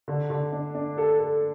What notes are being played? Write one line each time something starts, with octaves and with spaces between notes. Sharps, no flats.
D3
D3
D4
D4
A4
A4